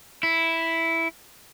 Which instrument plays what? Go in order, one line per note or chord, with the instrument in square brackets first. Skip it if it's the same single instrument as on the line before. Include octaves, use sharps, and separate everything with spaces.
[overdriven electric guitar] E4